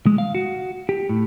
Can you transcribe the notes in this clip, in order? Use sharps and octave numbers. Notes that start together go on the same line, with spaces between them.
G#3
F5
F#4
G4
A2